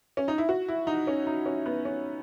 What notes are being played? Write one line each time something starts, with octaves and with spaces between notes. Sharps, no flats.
C#4
D#4
E4
F#4
E4
D#4
C#4
D#4
C#4
B3
C#4